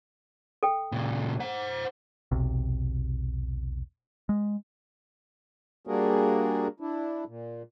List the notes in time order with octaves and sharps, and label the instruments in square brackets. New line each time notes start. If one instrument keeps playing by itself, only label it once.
[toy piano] A4 G5
[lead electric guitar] A#2 C#3
C5 F#5
[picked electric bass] E1 B1 C3
G#3
[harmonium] G3 A#3 D4 F#4 G#4 A#4
D4 E4
A#2